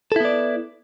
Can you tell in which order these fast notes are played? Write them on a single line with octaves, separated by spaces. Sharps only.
A4 E4 B3 D5